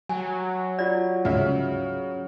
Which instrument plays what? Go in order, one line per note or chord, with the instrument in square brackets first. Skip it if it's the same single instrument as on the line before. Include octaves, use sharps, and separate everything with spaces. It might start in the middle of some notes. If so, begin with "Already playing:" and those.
[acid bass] F#3 [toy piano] G#5
[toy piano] F4 D5
[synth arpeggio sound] D2 G#2 E5 [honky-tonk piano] C#3